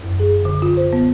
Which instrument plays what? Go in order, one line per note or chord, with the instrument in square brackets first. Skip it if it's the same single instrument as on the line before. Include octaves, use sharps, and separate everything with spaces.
[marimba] F#2
G#4
D3
F4
C5
B3